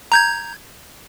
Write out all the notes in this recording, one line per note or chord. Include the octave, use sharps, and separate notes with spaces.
A#5 G6 G#6